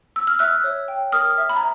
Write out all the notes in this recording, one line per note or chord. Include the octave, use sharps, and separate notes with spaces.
E6
F6
E5 E6 F#6
C#5
G5
A#4 D#6 F6
E5
B5
A#5